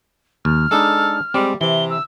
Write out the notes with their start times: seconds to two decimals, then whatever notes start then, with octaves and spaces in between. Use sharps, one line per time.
0.45 D#2 F6
0.71 G#3 D4 D#4 A4
1.34 G3 G#3 C4
1.61 C3 E3 G7
1.90 E6